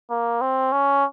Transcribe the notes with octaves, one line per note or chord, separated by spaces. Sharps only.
A#3
C4
C#4